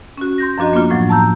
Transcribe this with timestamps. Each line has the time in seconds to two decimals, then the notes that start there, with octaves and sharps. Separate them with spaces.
0.17 C#4 F#4
0.38 C6 G6 A#6
0.58 F#2 F3 D4 F#4 D#5
0.73 A#3 B3 D4 F4
0.90 A2 F3 F#3
1.09 A5 A#5 E6 G6